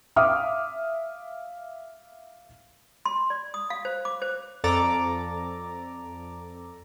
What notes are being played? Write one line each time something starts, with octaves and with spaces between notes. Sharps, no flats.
E5 F5 D6 D#6 F6
C6
D5
D#6
F5
C5
D6
C5
F2 A4 D5 A#5 D6 A6